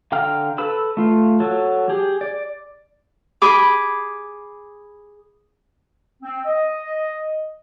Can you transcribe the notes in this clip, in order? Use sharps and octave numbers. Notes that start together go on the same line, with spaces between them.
D3 F5 G5 A#5 F6
A4 B4 B5 E6
A3 F4
F#3 A4
G4 G#4
D5
G#4 B5 D6
C4
D#5